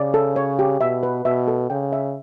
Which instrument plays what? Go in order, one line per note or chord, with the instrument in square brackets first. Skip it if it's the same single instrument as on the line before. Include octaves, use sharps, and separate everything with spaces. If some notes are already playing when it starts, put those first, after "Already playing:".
Already playing: [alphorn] C#3 [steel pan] D5
[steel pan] A4
C#5
G4
[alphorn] B2 [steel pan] E5
[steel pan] B4
[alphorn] B2 [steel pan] E5
[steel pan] A4
[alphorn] C#3 [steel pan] G5
[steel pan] E5